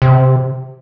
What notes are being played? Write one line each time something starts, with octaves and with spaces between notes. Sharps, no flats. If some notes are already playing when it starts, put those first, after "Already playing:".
C3